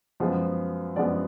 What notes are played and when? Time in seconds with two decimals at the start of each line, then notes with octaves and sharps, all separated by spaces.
0.20 F#2 F3 G#3 B3
0.96 F#2 F3 G#3 B3 D5